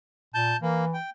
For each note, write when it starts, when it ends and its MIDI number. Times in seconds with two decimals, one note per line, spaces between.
0.35 0.55 46
0.35 0.57 81
0.35 0.57 91
0.62 0.97 52
0.62 0.85 58
0.94 1.10 79